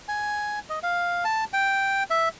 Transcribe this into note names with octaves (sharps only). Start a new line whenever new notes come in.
G#5
D#5
F5
A5
G5
E5